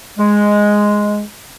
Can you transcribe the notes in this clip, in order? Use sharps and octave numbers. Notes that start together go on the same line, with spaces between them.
G#3